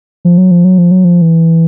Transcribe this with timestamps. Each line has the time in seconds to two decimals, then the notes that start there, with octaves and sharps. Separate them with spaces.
0.25 F3
0.38 F#3
0.51 F3
0.65 F#3
0.78 F3
0.91 F#3
1.05 F3
1.22 E3